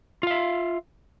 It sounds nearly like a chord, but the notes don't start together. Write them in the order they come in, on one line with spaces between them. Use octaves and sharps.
F4 F5 E5